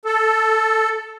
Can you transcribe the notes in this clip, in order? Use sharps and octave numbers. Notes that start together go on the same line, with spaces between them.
A4